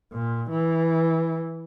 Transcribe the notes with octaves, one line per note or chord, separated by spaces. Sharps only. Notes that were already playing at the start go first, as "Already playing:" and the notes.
A#2
E3